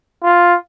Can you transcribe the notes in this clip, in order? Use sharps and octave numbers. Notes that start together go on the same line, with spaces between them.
F4